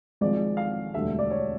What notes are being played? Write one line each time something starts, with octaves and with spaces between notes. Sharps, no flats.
G#1 G#2 F3 G#3 D5
F5
E1 D2 D3 G3 E5
D5
C#5